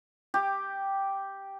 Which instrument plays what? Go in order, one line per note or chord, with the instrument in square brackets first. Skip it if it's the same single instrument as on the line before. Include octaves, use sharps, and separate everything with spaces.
[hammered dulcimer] G4